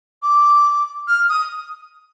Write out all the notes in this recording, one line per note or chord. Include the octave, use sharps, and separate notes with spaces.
D6
F6
D#6